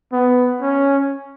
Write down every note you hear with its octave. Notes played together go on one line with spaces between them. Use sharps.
B3
C#4